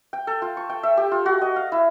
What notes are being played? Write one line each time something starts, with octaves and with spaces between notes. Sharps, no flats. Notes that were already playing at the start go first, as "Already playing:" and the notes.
G5
A4
F4
C#6
G5
E5
G4
F4
F#4
D#5
F5
E4